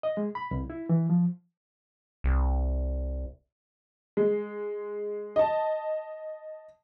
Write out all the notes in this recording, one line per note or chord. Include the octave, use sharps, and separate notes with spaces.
D#5
G#3
B5
C2
E4
E3
F3
C2
G#3
D#5 A5